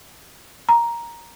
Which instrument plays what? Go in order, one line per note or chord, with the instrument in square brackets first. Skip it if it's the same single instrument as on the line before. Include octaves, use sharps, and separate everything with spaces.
[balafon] A#5